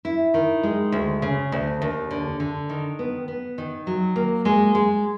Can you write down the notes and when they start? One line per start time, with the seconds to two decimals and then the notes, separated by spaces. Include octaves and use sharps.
0.05 E4
0.34 D#3
0.63 G#3
0.92 D2
1.22 C#3
1.52 D2
1.82 D#2
2.11 D3
2.40 D3
2.69 D#3
2.99 B3
3.28 B3
3.58 D#3
3.87 F#3
4.16 A#3
4.45 G#3
4.75 G#3